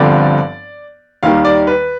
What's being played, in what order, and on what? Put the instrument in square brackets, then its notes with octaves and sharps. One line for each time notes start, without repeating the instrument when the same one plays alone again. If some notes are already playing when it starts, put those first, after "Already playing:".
Already playing: [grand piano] G1 G2 D3 F3 C4 D5
D#2 D#3 G3 F5
D5
B4